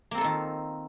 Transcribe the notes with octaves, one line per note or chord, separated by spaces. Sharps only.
D#3 A#3 C4 F4 A4